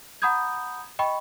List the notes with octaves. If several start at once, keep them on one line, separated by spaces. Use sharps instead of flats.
F#5 A#5 B5 D#6 G6 G#6
D#5 G5 B5 C#6